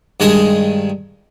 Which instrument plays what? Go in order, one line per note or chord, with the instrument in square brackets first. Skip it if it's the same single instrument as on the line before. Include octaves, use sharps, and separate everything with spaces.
[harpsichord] G2 D#3 G#3 G#4 D#5